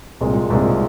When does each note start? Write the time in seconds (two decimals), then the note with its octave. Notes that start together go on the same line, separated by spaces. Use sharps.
0.21 C2 A#2 G#3
0.50 C2 A#2 G#3